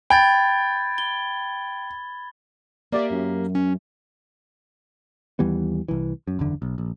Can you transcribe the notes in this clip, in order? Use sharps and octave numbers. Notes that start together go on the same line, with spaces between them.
G5 B5 G#6 A6
G7
A#3 G4 D5 E5
F#2
C#4
D#2 E3 G3 B3
C2 E3
F#2
F#1 E2 D3
B1
A#1